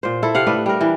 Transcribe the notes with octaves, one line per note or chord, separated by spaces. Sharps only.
A#2 C5
E4 A4
C3 F5 F#5
A2 A3 D4 B4
G3 A#4
E3